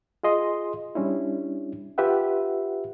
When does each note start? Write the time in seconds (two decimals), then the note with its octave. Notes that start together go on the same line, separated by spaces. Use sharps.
0.23 F4 G#4 D#5 C6
0.95 G3 C#4 D4 E4
1.98 F4 G4 B4 E5 F#5